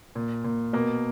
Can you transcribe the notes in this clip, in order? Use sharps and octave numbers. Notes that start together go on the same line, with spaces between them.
A#2
A#2
B2 A#3